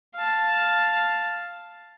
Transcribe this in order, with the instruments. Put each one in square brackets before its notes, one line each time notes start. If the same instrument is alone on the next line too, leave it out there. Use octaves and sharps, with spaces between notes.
[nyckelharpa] F5 A5